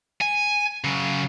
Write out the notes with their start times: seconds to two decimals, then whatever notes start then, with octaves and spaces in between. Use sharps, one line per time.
0.22 G#5
0.84 C#3 F#3